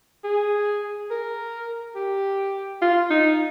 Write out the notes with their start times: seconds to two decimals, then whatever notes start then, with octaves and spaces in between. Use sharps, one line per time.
0.24 G#4
1.10 A#4
1.95 G4
2.82 F4
3.10 D#4